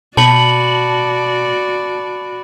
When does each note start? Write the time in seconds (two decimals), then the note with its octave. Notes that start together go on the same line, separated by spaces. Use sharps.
0.17 B2 F#4 D5 A5 B5 C#7 F#7